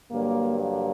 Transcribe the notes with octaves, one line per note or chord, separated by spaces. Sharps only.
G2 D3 F#3 A#3
A#3